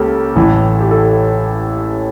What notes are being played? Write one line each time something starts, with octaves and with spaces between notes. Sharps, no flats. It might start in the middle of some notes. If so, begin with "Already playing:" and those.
Already playing: C#2 C#3 A#3 G4 A4
A1 A2 E3
G4
A4